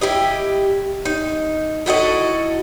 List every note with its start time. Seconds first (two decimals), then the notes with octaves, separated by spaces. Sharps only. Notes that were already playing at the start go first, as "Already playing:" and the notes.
0.01 E4 G4 D#5
1.05 D#4
1.86 E4 F#4 A4 D#5